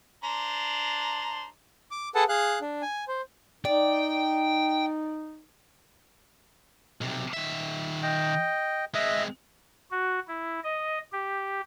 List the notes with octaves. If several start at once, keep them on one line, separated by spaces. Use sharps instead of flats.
D4 C5 A#5
D6
G#4 A4 B4 F#5 A5
G#4 F5 F#6
D4
G#5
C5
D#4 D5 G5
B1 C3
D#3 E5
D#5 G5
G#3 C4 D#5 E5
F#4
E4
D#5
G4